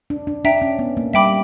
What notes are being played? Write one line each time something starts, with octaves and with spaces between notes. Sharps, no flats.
D4
D4
D4 E5 G5 A#5
C#4
B3
A#3
G3 E5 G5 B5 D6